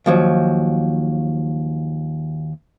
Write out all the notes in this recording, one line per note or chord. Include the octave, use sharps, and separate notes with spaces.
D#2 F3 F#3